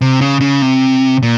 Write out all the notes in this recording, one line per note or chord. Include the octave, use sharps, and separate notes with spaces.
C3
C#3
C#3
C3
A#2